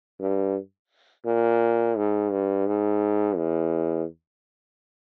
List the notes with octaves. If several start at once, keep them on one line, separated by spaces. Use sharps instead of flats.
G2
A#2
G#2
G2
G#2
E2